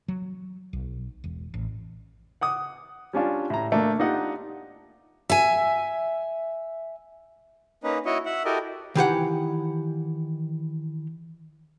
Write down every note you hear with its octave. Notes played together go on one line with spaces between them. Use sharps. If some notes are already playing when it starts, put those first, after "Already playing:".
F#3
B1
E1
A1
F#5 D6 D#6
G3 C#4 D4 F4
A2 A#5
A3 A#3 D4
D4 D#4 F4 G4 D#5 F#5
E5 G#5
A#3 C#4 D#4 B4
E4 F#4 C#5 D#5
E5 F#5
E4 F#4 G4 A4 A#4 D#5
D#3 E3 G4 F#5